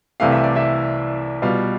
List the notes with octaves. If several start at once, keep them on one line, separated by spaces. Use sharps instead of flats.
C2 C3 E3 A3 F5
E5
D5
E4 E5
B2 G3 B3 F4 F5